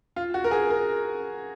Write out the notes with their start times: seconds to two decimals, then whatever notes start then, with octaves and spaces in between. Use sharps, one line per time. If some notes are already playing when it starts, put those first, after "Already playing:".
0.16 F4
0.34 F#4
0.44 A#4
0.51 G#4
0.70 A#4